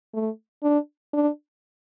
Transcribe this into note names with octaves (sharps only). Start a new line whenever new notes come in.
A3
D4
D4